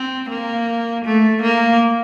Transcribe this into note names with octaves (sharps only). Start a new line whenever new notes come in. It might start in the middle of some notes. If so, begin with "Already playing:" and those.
Already playing: C4
A#3
A3
A#3